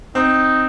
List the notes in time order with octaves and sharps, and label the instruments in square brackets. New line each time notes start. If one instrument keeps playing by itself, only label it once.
[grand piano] C4 [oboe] D#4